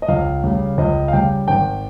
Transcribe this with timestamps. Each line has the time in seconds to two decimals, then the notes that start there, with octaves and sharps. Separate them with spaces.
0.02 D#5
0.09 C#2 F5
0.44 C#3 G3
0.78 C#2 D#5
1.08 F5
1.13 C#3 G3 G5
1.48 G#1 G5